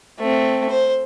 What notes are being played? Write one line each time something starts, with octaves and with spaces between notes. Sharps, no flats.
A3 C4
C5